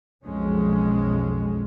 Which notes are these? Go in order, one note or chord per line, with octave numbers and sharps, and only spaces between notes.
B1 F2 G#3 C#4